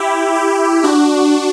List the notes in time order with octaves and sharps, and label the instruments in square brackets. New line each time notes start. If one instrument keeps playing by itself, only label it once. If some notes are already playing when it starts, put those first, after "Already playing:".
Already playing: [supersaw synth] E4 G4
E4 G4
D4 F#4